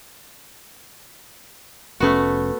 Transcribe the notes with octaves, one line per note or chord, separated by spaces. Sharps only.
F1 A3 B3 C#4 F#4